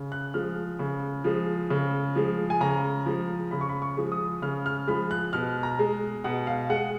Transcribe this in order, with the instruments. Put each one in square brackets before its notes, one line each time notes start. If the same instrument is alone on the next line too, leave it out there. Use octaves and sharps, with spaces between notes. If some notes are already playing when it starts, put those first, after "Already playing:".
Already playing: [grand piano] C#3
F#6
F3 G#3 F6
C#3
F3 G#3
C#3
F3 G#3
G#5
C#3 A#5
F3 G#3
C#3 B5
C#6
B5
C#6
F3 G#3
D#6
C#3 F6
F6
F3 G#3 B5
F#6
B2 F6
A#5
G#3
B2 F#5
F5
G#3 F#5